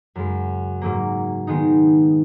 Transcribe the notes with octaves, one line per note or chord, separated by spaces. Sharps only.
F#2 C#3 G#3
G#2 F#3 A#3
D#3 G#3 B3 D#4